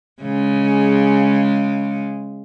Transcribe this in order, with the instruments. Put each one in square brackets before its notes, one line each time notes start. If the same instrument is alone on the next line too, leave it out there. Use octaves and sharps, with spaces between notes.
[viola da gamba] C#3 G#3